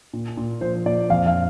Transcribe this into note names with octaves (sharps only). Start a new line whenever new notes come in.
A#2
A#2
F3 C5
A#2 D5
F2 F5
F5